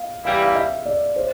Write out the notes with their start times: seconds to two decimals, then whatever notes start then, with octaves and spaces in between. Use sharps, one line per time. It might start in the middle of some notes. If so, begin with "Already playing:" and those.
Already playing: F5
0.24 E3 G3 A#3 E4 F5
0.44 F5
0.55 E5
0.85 D5
1.16 C5